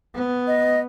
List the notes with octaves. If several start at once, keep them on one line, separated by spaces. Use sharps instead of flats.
B3
D#5